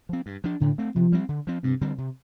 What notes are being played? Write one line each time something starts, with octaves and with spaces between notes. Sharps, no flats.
F3 C4
G2
F3 D4
A2 D3
A3 C4
C3 F3
G3 C4
D3
F3 C4
G2 C3
D3 G3 C4
C3